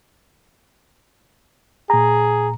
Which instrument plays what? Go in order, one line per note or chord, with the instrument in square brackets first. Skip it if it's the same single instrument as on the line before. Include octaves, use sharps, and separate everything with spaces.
[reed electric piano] A#2 A#5 [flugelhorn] G#4